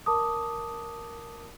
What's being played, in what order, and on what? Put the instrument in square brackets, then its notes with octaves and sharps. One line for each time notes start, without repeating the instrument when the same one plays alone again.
[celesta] A#4 A5 D6 D#6